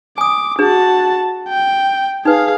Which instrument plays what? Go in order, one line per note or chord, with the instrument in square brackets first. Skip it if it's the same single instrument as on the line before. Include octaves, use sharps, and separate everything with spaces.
[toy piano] G#5 D#6 [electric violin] D6
[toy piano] D4 G#4 [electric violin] F#4 A5
[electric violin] G5
[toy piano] D#4 B4 [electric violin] G#4 F5